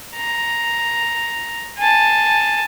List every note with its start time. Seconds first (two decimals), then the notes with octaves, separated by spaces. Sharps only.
0.16 A#5
1.78 G#5 A5